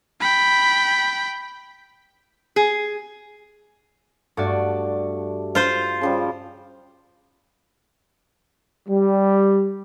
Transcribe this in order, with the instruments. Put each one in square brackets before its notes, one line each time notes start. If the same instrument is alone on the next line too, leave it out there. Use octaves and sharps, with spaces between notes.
[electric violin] G5 B5
[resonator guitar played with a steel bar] G#4
[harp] G2 F#4 D5 [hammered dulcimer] A3
[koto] F4 C5 F5
[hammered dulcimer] C#3 F3 G3
[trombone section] G3